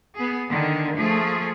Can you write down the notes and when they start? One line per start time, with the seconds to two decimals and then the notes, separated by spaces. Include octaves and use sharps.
0.15 B3 G#4
0.48 D3 D#3
0.96 F3 A3 G#4